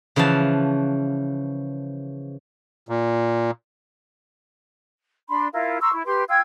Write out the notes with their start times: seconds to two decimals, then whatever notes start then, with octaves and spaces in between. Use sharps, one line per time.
0.16 C#3 E3 F3 F#5 A5
2.89 A#2
5.28 D4 B5 C6
5.53 E4 F4 A#4
5.81 A#5 C6 C#6 E6
5.92 E4
6.05 G4 B4 C6
6.28 F4 G5 E6 G#6